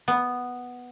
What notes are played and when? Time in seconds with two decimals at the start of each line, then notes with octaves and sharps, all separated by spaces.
0.08 B3